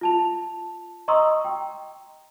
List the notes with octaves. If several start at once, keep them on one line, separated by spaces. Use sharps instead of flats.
F4 A5 F7
D#5 A#5 C6 C#6 D#6 E6
G5